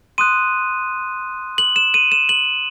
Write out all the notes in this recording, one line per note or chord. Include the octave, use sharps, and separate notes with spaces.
C6 D#6 F#6 D#7
F#7
E7
D#7
E7
F#7